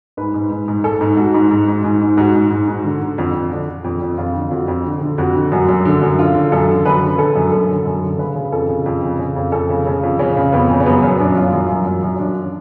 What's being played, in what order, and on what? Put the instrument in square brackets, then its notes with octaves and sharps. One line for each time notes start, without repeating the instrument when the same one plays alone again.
[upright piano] G#2 B4
G#2
G#2
G#2
G#2 A4
G#2
G#2 F#4
G#2
G#2
G#2
G#2
G#2
G#2 F#4
G#2
G#2
G#2
D3
D3
F2
F2
D3 D4
D3
F2
F2
F2 F4
D3
F2 F#4
F2
D3
D3
F2 F#4
D3
F#2 F#4
F#2
D3
F#2
D3 F4
D3
F#2 A4
D3
F#2 B4
D3
D3 A4
F#2
F#2 A4
D3
F#2
D3
C#3 B4
C#3
F2 A4
C#3
F2
C#3
C#3
F2
F2 A4
C#3
C#3
F2
C#3 C#4
C#3
F2 B3
C#3
C#4
F#2 B3
F#2 C#4
F#2 D4
F#2 F4
F#2
F#2
F#2
F#2
C#4
F#2 D4